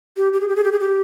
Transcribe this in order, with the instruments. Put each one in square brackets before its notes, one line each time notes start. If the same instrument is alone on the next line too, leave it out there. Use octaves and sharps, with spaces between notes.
[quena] G4
G4
G#4
G4
G#4
G4
G#4
G4